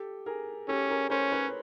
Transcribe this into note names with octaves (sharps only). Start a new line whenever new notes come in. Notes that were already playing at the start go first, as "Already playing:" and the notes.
Already playing: G4 A4
G#4 A#4
C#4 G4 A4
G#4 A#4
C#4 A#4 C5
B4 C#5